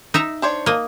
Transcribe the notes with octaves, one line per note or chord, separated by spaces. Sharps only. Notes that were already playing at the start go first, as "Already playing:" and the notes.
D#4 E5 A#5
D4 C5 C#5
A#3 D#5